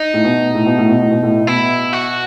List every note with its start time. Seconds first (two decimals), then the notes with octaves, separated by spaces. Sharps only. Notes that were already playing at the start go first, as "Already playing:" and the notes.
Already playing: D#4
0.14 A2
0.24 B2
0.55 A2
0.66 B2
0.78 A2
0.89 B2
1.00 A2
1.11 B2
1.23 A2
1.47 B2 E4
1.93 F#4